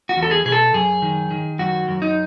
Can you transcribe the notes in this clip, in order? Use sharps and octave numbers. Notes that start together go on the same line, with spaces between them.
F#4
E2
A4
G#4
B2 G#4
A4
F#2 G#4
D#3
D#3
F#2 F#4
F#2
D#4